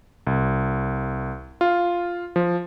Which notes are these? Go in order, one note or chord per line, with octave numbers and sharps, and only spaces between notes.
C2
F4
F3